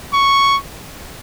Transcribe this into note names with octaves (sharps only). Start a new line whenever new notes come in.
C#6